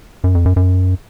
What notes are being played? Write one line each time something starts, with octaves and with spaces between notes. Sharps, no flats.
F#2
F2
F#2
F#2